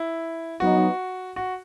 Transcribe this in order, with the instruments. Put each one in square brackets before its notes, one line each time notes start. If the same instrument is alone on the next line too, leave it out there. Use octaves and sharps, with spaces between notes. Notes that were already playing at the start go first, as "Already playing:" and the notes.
Already playing: [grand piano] E4
[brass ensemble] F#3 B3 D#4 [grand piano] F#4
[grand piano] F#4